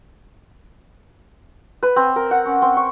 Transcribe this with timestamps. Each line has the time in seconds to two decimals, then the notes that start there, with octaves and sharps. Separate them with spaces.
1.83 B4
1.96 C4
2.16 A#4
2.31 F#5
2.45 C#4
2.62 C4
2.77 C#6